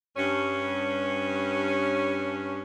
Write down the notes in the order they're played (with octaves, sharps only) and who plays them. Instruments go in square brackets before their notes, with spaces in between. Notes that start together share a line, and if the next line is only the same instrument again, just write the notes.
[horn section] G2 C#4